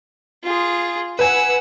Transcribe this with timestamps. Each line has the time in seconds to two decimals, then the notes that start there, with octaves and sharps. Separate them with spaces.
0.44 F4 G#4
1.19 B4 F#5 G#5 E6